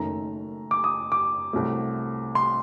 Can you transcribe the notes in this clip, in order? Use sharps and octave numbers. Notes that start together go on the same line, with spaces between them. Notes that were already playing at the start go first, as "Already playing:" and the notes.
Already playing: F#1 F#2 D#3 A3 A#5
D6
D#6
D6
C2 C3 F#3 A3
C6